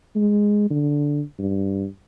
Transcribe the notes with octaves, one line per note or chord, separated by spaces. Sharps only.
G#3
D3
G2